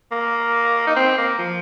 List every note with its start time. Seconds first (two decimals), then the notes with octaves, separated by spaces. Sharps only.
0.12 A#3
0.87 D#4
0.96 C4
1.18 A#3
1.39 F3